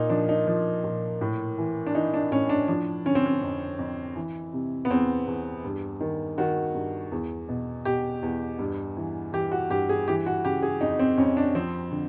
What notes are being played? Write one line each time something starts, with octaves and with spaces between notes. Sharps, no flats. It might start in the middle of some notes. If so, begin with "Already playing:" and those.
Already playing: A#2 D#4
F3 D4
D#4
F3
A#2
A2
E3
D4
E3 D#4
D4
A2 C#4
D4
F3 D4
D3 C#4
C4
C#4
F2
F2
E3
C3
B3
E2 C4
E2
G2
D#3
D#3 F#4
G2
E2
B2
B2 G4
E2
G2
E3
E3 G4
F#4
G2 G4
G#4
E3 G4
F#4
C#3 G4
G#4
F2 D#4
C4
F2 C#4
D4
F3 C4
D3